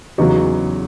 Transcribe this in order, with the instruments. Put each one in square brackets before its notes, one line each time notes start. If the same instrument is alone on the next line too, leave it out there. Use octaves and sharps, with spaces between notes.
[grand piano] E2 C#3 F#3 D#4 F#4